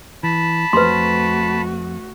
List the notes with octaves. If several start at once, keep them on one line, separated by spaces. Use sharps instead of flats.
E3 A5 B5
F2 A3 F#4 B4 C5 C6